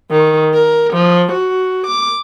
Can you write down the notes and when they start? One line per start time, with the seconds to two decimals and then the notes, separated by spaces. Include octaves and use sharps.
0.11 D#3
0.54 A#4
0.94 F3
1.32 F#4
1.87 D6